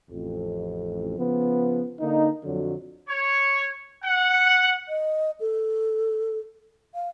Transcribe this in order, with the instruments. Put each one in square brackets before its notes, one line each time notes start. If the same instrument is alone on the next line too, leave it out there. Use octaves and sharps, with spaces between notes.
[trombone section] A1 F2
C#3 F3 B3
D3 A#3 D#4
F2 D3 F#3
[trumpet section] C#5
F#5
[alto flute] D#5
A4
F5